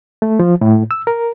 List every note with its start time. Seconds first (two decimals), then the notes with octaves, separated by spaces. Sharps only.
0.22 A3
0.39 F3
0.61 A2
0.91 E6
1.07 A#4